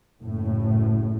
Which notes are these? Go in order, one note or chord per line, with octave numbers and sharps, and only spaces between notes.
F#1 A2